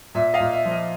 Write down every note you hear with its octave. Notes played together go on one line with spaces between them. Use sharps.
A#2 E5
D#5 F5
A#2
E5
F3
D#5